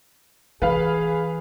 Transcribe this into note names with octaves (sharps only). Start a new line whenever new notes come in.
E3 G#4 B4 F5